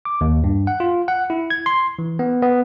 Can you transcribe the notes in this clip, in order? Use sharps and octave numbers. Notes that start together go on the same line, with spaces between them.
D6
D#2
G2
F#5
F4
F#5
E4
G#6
C6
E3
B3
B3